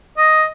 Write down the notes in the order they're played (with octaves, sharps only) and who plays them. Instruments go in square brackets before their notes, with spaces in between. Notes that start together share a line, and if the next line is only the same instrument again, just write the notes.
[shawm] D#5